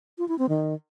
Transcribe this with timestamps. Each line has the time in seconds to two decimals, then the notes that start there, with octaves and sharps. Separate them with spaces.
0.18 F4
0.28 E4
0.39 C4
0.49 D#3